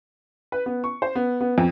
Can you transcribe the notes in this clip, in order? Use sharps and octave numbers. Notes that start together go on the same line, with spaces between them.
B4
B3
C#6
C5
B3
B3
F2